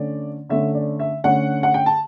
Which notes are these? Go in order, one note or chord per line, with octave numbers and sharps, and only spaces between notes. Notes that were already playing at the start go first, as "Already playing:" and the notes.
Already playing: D3 A3 C#4 D5
D3 A3 C#4 E5
D5
E5
D3 A3 C#4 F#5
F#5
G5
A5